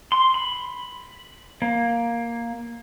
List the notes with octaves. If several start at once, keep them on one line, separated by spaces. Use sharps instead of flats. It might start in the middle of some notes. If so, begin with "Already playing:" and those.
C6
B5
A#3